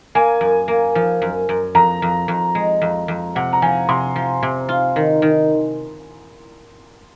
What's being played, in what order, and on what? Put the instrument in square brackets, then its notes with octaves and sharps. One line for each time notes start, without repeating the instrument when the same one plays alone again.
[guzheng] A#3 [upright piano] G#5
[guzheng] F#2
A#3
F3
F#2
F#2
[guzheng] F2 [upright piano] A#5
[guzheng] F2
F2
G#3
F2
F2
[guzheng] C3 [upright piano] F#5
[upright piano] A#5
[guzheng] F3 [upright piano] G#5
[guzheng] C3 [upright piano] C6
[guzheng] F3
C3
F4
D#3
D#3